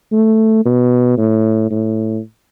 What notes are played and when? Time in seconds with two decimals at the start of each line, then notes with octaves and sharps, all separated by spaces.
0.12 A3
0.65 B2
1.18 A2
1.71 A2